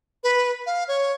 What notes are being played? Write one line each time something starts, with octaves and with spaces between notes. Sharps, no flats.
B4
F5
C#5